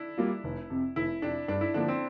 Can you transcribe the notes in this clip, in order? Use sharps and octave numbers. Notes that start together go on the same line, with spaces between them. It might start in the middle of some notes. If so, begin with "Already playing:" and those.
Already playing: D4 E4
G3 A#3 F4
F1
F2 C3
F1 E4
F2 C3 D4
G2 D4
E4
D3 F3 A#3 D4
C4